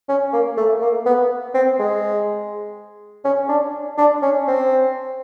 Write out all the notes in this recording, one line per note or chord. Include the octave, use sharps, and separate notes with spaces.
C#4
A#3
A3
A#3
B3
C4
G#3
C#4
D4
D4
C#4
C4